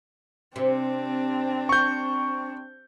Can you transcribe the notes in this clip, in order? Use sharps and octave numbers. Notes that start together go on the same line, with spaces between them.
C3 C4 D4
C#6 G6